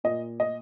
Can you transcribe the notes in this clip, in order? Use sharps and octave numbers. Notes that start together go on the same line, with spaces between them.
A#2 D#5
D#5